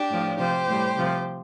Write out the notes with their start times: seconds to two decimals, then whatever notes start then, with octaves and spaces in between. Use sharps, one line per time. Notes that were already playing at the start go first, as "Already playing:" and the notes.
Already playing: D4 G4
0.09 A2 F3
0.38 C3 F3 G4 C5
0.67 A2 G3
0.96 C3 F3